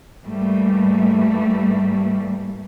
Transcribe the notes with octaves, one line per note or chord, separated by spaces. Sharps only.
G#2 E3 G3 A3 A#3